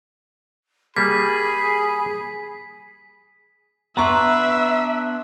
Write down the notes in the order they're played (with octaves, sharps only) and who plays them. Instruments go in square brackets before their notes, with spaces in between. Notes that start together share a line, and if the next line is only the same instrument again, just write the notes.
[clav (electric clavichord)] G3 A#3 [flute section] G#4 [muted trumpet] B5 [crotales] B6
[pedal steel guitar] B3 D4 B4 [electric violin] E5 [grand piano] A#5 C6 C#6